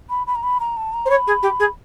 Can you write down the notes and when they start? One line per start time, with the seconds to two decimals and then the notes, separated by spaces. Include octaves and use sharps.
0.10 B5
0.27 B5
0.35 A#5
0.43 B5
0.60 A#5
0.77 A5
0.93 A#5
1.05 C5
1.10 C#5 B5
1.27 G#4
1.42 G4
1.59 G#4